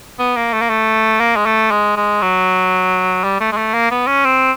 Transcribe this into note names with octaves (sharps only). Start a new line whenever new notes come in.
B3
A#3
A3
A#3
A3
A#3
G#3
A3
G#3
G#3
F#3
G3
A3
G#3
A3
A#3
B3
C#4
C4